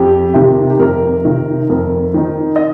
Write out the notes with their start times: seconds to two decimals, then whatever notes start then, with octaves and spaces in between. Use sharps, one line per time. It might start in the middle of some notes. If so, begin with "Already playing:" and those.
Already playing: F2 G4
0.34 C3 D#3 G4
0.70 G4
0.79 F2 A#4
1.25 C3 D#3
1.70 F2 A#4
2.14 D#3 C4 D#4
2.56 D#5